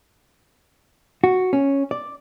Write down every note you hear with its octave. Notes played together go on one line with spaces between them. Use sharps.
F#4
C#4
D5